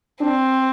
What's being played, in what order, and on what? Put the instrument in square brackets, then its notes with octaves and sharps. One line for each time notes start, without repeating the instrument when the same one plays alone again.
[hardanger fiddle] C4 [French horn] D4